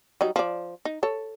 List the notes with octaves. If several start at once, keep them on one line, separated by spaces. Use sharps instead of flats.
F#3 G3 D#4
F3 D5
D#4
A4 C#5